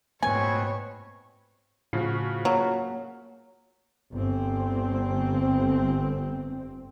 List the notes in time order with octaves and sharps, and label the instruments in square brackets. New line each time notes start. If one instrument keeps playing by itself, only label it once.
[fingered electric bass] G#2 A3 A#3 [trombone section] B2 C4 B4 [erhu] C#5 [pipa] G#5
[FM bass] A2 [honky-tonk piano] C#3 F3 F#4
[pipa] F#3 [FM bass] A#3
[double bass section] G1 C4